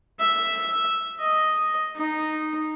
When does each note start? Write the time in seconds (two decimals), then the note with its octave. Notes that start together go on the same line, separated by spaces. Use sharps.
0.19 E5
1.19 D#5
1.95 D#4